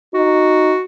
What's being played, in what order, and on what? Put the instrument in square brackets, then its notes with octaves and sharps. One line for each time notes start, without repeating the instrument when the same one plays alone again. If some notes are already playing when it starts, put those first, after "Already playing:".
[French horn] D#4 [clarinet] F#4